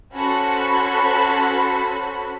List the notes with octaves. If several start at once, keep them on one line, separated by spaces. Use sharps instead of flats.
C#4 F#4 A4 C5 B5